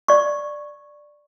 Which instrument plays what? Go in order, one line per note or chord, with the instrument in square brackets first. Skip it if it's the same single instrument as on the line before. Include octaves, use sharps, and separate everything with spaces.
[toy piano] D5 C#6